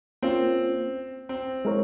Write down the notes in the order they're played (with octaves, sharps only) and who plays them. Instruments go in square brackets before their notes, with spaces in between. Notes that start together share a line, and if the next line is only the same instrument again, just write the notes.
[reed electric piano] A#3 C#4 F4 [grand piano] C4
[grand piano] C4
[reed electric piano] G#3 E4 A#4 C#5